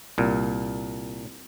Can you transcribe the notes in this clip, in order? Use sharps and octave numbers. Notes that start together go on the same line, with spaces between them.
C2 A#2